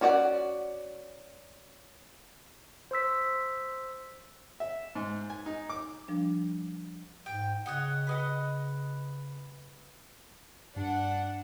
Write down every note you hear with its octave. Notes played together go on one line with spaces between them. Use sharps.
C#4 F#4 D5 D#5 F#5
C5 C6 E6 B6
E5
G#2
G#5
D#4
D6
F3 G3 D4
G#2 G5
C#3 C#5 D#5 F#5
B4 D#5 F#5
G2 D4 F#5